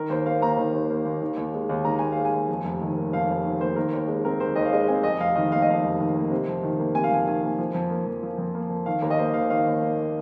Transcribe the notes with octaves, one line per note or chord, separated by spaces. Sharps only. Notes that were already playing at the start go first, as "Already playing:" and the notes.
Already playing: D#3 A#4
D#2 C5
A#3 F5
D#2 A#5
D#3
D#2
A#3
D#2
D#3
D#2
G#3
D#2
D#3 A#5
D#2 G#5
F5
G#3
G#5
D#2
F2
F1
D#3
A#3
F2 F5
F1
D#3
A#3 C5
D#3 A#4
D#2
G#3
C4 A#4
D#3 C5
D#2 D#5
F5
G#3 D#5
C4 G#5
F2 D#5
F1 F5
D#3 D#5
A#3 F5
D#5
F2 F5
F1
D#3
A#3
C3
F2
D#3
A#3
C3 G#5
F5
F2 G#5
D#3 G#5
A#3
F3
F2
A#3
F2
F3
F2
A#3
F2
D#3 F5
D#2 A#4
D#5
A#3 C5
D#2 F5
D#3 F5
D#2
A#3